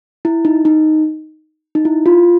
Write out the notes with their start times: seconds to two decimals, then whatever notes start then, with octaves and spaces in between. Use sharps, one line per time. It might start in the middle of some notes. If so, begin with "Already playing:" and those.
0.25 E4
0.45 D#4
0.65 D#4
1.75 D#4
1.85 E4
2.06 F4